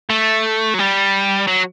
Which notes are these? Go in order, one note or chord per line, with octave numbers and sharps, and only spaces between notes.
A3
F#3
G3
F#3